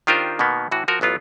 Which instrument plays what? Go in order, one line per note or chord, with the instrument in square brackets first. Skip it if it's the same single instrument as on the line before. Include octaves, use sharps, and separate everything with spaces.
[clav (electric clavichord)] D#3 D4 F4 G4 A#4 C5
B2 D#3 A#3 B3
A2 E3 F#4
F3 F#4 A#4
A1 F#3 B3 F4